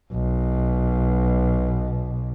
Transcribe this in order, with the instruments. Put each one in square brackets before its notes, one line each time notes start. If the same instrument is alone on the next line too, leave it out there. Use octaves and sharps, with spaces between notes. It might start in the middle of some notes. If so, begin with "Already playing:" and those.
[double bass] B1 B2